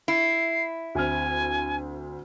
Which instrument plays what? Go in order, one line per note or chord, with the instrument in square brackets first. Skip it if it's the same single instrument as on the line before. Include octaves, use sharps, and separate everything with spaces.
[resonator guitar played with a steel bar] E4 [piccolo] C7
[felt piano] D2 C4 F6 [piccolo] G#5